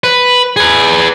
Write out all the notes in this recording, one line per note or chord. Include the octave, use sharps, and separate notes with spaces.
B4
G#4 B4